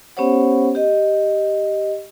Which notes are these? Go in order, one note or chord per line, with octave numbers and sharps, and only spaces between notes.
B3 C#4 G4 C5 C#5 F#5
G4 D#5